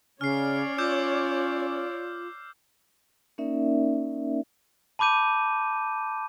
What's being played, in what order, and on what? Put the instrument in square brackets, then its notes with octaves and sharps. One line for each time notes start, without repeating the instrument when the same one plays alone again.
[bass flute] C#3 [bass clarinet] C#4 [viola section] C#5 D5 [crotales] F6 C7
[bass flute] F4 [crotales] D6 E6 G6
[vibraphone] A#3 C#4 D#4 A#4 D5 E5
[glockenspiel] A5 B5 D6 G6 D#7